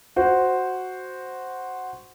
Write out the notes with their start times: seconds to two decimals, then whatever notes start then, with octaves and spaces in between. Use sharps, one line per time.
0.16 F#4 C5